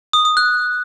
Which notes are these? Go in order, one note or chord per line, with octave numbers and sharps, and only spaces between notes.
D#6
D#6
F#6